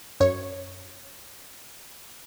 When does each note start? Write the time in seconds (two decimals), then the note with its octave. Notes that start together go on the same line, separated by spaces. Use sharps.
0.20 F#2 C#5